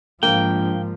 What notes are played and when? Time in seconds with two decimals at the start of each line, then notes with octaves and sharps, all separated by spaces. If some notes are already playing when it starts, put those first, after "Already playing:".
0.23 A#1 G#2 F3 A#3 G5